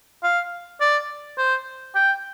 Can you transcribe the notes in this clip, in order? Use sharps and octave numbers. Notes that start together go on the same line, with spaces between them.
F5
D5
C5
G5